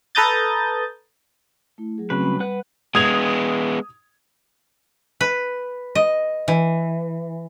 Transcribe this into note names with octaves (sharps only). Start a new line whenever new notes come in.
A4 B4 A#5 D#6 G6 A6
A3 E4
F#3 G#4
C#3 F#3 A3 C4 B4
G3 B5
B4 F#5 F#6
G#3 B3 D#6 G#6 F7
B4
D#5
E3